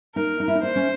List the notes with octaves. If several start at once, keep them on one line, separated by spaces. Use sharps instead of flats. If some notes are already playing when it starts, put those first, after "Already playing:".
D#4 A#4
D#4
E4
D#4
D4 C5
C#4